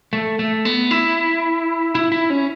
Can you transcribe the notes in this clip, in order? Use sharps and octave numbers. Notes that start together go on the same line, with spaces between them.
A3
A3
B3
E4
E4
E4
C#4